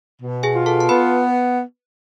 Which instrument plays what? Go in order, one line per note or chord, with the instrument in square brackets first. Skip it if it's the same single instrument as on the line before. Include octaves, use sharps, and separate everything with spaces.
[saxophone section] B2
[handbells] G#4 G#5
[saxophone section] F4
[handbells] A4 A5
A5
[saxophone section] B3 [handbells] B4 B5